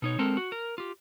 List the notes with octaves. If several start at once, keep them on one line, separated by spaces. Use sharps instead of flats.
B2 D#4 C#5
G#3 C4 A4 A#4
F#4
A#4
F4 G4